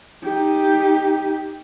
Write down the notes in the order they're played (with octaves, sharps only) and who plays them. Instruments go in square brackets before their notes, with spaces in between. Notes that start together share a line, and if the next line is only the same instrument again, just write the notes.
[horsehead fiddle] D#4 G4